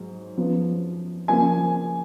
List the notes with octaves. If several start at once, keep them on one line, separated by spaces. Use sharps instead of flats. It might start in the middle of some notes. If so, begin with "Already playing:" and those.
Already playing: G#2 F#3
F#2 F3 B3
C#3 F3 A#3 G#5